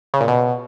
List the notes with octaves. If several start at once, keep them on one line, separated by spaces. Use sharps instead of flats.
C#3
A#2
B2